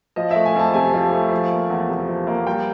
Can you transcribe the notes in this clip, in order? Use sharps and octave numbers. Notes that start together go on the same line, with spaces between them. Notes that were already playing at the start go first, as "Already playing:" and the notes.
F3 D#5
A3 E5
G#5
F2 A5
C3 G#5
F3
A3
F3
A#3
E2
C3
F3
A#3
G3 G5